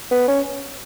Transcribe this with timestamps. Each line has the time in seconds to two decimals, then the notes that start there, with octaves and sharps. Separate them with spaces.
0.11 B3
0.28 C#4